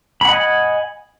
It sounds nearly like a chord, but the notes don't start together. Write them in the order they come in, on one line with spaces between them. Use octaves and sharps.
B5 F#5 D#5 G#5